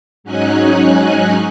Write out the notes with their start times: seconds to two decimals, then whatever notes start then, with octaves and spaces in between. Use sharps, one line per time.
0.24 G#2 F#3 C#4 D#4 G#5 F#6